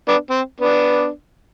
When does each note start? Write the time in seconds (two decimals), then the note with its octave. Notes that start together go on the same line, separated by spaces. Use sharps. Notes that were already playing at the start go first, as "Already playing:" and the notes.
0.08 B3 D4
0.30 C4
0.61 B3 D4